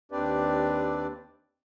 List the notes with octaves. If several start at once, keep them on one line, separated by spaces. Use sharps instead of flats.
D#2 C4 D4 G4 B4 D5